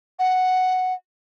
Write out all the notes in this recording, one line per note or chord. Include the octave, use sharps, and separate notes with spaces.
F#5